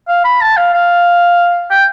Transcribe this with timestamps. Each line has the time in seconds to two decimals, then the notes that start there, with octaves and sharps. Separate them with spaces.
0.08 F5
0.24 B5
0.41 A5
0.56 F5
0.74 F5
1.70 G5